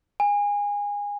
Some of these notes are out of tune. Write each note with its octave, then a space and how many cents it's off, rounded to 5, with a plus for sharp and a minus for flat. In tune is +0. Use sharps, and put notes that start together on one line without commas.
G#5 -25